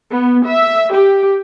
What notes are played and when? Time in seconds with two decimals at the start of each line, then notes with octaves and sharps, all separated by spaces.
0.11 B3
0.45 E5
0.92 G4